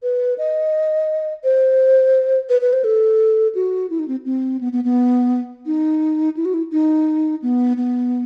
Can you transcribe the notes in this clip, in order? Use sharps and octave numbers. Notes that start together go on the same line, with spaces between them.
B4
D#5
C5
B4
B4
C5
A4
F#4
E4
D#4
C4
C4
B3
B3
B3
D#4
E4
F#4
E4
D#4
B3
B3